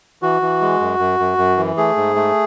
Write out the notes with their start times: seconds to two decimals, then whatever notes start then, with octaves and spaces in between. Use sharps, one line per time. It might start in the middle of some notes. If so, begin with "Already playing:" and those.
0.22 E3 F#4
0.42 E3
0.61 G#3
0.81 F#2
0.99 F#2
1.20 F#2
1.38 F#2
1.57 E3
1.77 A3 G#4
1.97 G#2
2.16 A3